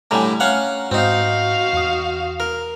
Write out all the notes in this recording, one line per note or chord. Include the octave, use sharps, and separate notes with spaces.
A2 D3 G3 G#5 A#5
C#4 F5 F#5
G#2 C4 D#4 F#4 F5
E2 D#6
A#4